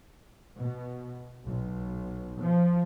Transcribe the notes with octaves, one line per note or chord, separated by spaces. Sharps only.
B2
B1
F3